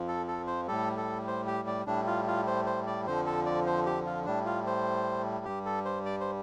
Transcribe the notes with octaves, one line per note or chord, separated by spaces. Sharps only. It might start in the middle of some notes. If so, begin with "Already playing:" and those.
Already playing: F2 F3
A4
A4
C5
A2 G3 A4
A4
C5
G4
D5
A2 G3 D4
F4
F4
C5
C5
D5
F2 D3 F3 C5
A4
D5
C5
G4
F4
A2 G3 D4
F4
C5
G2 G3 G4
A4
C5
D5
C5